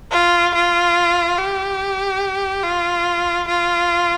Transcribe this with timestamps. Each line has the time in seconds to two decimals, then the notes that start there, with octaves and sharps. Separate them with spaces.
0.11 F4
0.54 F4
1.37 G4
2.64 F4
3.48 F4